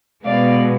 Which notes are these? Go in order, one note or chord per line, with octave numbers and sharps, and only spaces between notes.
B2 G#3 B3 D5 F5